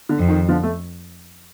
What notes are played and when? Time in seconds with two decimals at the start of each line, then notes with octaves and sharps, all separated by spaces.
0.09 D3
0.19 F2
0.29 D#3
0.48 D3 F3
0.63 A3